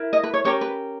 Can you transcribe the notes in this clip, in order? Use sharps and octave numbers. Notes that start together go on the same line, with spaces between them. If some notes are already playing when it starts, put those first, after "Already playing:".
Already playing: E4 A#4
D#5
B4
C#5
C#4 G4 A#4 C#5
B4